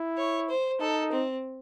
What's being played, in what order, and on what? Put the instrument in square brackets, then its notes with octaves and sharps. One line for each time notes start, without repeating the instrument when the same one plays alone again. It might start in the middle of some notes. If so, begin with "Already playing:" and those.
Already playing: [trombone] E4
[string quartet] C#5
C5
[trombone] D#4 [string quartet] A4
[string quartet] C4